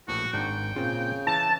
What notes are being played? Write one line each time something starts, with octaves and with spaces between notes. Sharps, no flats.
A#1 A2 F#4
G#1 G#2 D4 G5
A#2 C#3 C4 F4
E3 A5